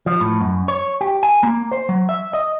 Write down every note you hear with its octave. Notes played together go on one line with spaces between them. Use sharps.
F3
A2
F#2
C#5
G4
G#5
A#3
C5
F#3
E5
D#5